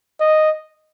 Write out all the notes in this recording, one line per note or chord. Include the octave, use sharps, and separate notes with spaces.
D#5